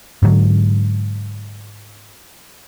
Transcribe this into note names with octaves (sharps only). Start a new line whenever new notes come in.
G#2 D3 F#3